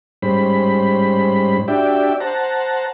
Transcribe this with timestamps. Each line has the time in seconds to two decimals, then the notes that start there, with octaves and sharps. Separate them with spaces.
0.22 G#2 G3 C#4 C5 B5
1.68 D4 F#4 G4 D5 E5 G5
2.20 C5 F#5 A5 A#5